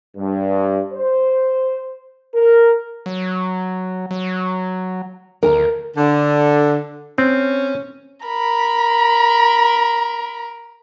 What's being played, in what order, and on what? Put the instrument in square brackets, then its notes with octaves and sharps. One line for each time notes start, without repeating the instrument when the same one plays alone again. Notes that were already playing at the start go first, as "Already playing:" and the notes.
[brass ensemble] G2
C5
A#4
[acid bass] F#3
F#3
[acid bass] D2 [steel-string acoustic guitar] A#4 G#5 A#5
[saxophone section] D3
[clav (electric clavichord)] C4 [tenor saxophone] C#4
[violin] A#4 [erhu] B5